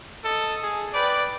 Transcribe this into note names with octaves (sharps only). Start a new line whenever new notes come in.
A4 D#5
G#4
B4 D5 G5